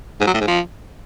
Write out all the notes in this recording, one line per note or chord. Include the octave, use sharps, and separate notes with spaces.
G#2
F#3
A2
G#2
F3